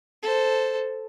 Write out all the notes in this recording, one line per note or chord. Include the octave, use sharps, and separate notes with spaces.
A4 C5